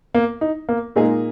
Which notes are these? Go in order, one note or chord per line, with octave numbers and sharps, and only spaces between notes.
A#3
D#4
A#3
A#2 G#3 A#3 D#4 G#4